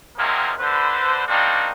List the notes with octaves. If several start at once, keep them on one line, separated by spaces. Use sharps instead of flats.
D#2 C3 F3 F#3 G#3 A#3
D3 B4 C5
G3 A#3 C4 D4 D#4 F#4